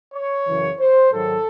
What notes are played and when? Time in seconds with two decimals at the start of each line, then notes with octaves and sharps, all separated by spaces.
0.13 C#5
0.46 F#2 C#3 E3
0.79 C5
1.12 G#2 D#3 F#3 A4